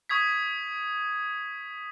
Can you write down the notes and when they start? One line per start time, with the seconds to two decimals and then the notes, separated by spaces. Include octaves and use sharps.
0.09 C#6 D#6 G#6 B6